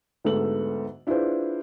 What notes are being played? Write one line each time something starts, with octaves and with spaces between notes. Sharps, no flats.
D2 G#2 B3 A4 F#7
D4 E4 F4 G#4 B4 C5